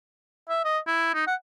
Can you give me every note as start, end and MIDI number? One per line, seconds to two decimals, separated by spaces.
0.49 0.64 76
0.64 0.79 75
0.87 1.13 64
1.14 1.23 63
1.27 1.35 78